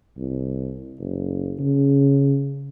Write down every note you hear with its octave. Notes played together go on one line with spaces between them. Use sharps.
C2
F#1
C#3